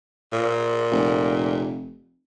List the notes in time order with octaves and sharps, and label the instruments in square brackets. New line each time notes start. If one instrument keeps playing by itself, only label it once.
[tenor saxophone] A#2
[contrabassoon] F1